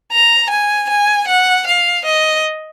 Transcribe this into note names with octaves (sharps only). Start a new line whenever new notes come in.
A#5
G#5
G#5
F#5
F5
D#5